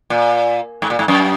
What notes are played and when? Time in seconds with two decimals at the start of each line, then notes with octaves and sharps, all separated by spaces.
0.10 A#2
0.82 G#2
0.90 A#2
0.99 G#2
1.08 F#2